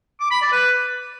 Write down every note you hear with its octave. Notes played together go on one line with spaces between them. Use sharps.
D6
B5
D5
B4